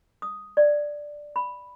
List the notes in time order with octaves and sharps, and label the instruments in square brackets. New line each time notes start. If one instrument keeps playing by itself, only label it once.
[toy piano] D#6
D5
B5